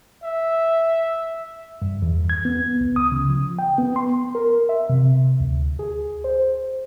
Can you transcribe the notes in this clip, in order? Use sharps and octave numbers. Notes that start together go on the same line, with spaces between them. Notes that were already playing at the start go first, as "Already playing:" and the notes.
E5
G2
E2
G#6
B3
C#2
D#6
C#3
F3
G5
B3
C6
A#4
E5
C3
D2
G#4
C5